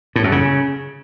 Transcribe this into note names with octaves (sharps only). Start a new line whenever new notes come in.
A2
F#2
C#3